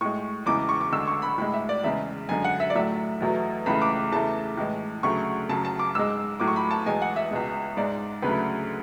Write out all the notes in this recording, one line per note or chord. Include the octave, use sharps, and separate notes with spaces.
A2 G#3 C#6
E2 C#3 E3 G#3 D6
C#6
D6
D2 D3 G#3 E6
C#6
B5
A2 G#3 B5
E5
D5
E2 C#3 G#3 E5
F#2 D3 G#3 G#5
F#5
E5
D5
A2 F#3 A3 E5
E2 B2 F#3 A3
C#2 C#3 E3 A3 B5
D6
E2 C#3 E3 A3 A5
A2 E3 G#3
D2 C#3 F#3 A3 C#6
F#2 C#3 F#3 A5
A5
D6
G#2 G#3 E6
A2 F#3 A3 D6
C#6
B5
A5
E2 B2 G#3 G#5
F#5
E5
C#2 B2 G#3
G#2 G#3 D5
D2 C#3 F#3 A3 B4